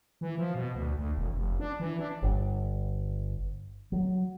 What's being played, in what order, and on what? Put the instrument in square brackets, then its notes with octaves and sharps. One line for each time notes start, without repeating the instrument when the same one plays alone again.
[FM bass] E3
F3
B2
D2
D2
E1
F1
D4
E3
D4
[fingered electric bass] G1
F#3